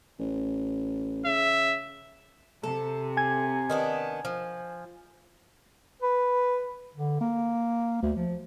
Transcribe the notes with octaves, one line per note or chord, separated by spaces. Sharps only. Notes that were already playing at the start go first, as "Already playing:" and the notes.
A1
C#3 E5
C3 A4
G#5 G#6
D#3 B3 D4
F3
B4
D3
A#3
D2
F3